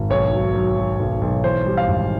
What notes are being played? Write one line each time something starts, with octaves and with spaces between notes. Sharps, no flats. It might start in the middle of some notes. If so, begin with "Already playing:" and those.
Already playing: G#1
B1 C#5
F#3
F#3
F#3
B1
B1
E3 C5
G3
F5
G#1